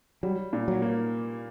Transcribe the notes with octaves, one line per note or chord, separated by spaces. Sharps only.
F#3 G3
A#2
F#3
A#3